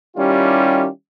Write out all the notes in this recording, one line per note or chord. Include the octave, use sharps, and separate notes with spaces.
D#3 G3 C#4 E4 F4 G4